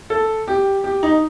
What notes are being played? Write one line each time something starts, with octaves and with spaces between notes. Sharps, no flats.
A4
G4
G4
D#4